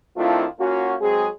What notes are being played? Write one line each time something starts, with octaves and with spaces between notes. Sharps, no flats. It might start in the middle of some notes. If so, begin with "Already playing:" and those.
D#3 A3 C4 D4 E4 F4
A#3 C#4 F4 F#4
F#3 G#3 C4 G#4